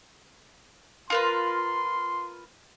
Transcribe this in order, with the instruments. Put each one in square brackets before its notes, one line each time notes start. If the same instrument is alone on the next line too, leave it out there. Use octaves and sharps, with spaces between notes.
[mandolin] F4 A#4 B4 [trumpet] C6